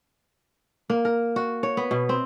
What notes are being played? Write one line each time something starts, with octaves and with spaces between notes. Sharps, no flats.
A#3
A#4
F#4
C#5
B3
B2
C4